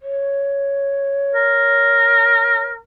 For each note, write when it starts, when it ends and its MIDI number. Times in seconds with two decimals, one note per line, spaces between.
0.02 2.65 73
1.35 2.78 70